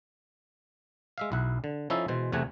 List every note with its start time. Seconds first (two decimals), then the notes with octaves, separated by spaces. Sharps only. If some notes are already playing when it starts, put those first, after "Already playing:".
1.18 G#3 E5 F5
1.32 B1 E4 F#5
1.64 D3
1.90 F3 C#4 D#4 E4 A4 E5
2.08 B2 E3 G#3 C5
2.32 E2 C3 A3 F#5 G#5